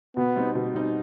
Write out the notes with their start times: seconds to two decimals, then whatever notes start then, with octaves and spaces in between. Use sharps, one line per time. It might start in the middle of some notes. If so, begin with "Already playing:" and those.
0.17 B2 B3
0.36 G3 C4 D#4
0.55 B2
0.74 G3 C4 D#4